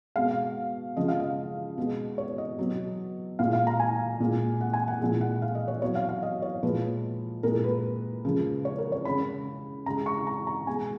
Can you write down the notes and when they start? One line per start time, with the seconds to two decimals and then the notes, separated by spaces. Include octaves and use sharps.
0.16 B2 G#3 F5
0.97 C#3 F3 G#3 D#5
1.08 F5
1.20 D#5
1.78 B2 G#3
2.18 C#5
2.38 D#5
2.59 B2 F#3
3.39 A#2 G#3 F5
3.53 F5
3.67 A#5
3.80 G#5
4.20 A#2 G#3
4.61 F#5
4.73 G#5
4.88 F#5
5.01 A#2 F3 G#3
5.21 F#5
5.42 F5
5.55 D#5
5.68 C#5
5.82 B2 F#3 C#5
5.95 F5
6.09 F5
6.23 D#5
6.42 C#5
6.63 A#2 F3 G#3 B4
7.43 A#2 G#3 A#4
7.64 B4
8.25 C#3 F3 G#3
8.65 C#5
8.78 A#4
8.92 C#5
9.05 C#3 G#3 B5
9.86 C#3 G#3 A#5
10.06 C#6
10.27 A#5
10.47 A#5
10.67 B2 G#3 G#5